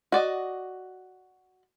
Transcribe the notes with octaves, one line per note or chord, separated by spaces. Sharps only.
F#4 D5 D#5